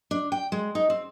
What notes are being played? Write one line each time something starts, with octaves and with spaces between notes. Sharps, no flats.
D4
G5
G#3
D#4
C4